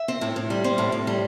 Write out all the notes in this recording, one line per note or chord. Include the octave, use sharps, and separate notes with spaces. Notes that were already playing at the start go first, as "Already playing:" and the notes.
Already playing: E5
C4
A2
A2
G3
C4
A2
A2
G3